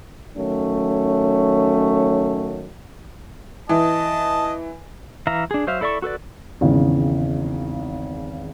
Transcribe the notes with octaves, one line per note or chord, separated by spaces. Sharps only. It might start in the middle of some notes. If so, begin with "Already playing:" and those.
D#3 F#3 A3 C#4
E3 D#5 A5
E3 E5 F5 A#5
D4 G#4
F#3 C5 E5 F5
E4 A4 D5 E5 C#6
F#4 A4 B4 D5
G#1 E2 C#3